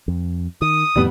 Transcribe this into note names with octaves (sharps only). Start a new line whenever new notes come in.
F2
D#3 D#6
F2 A2 D#3 G3 B3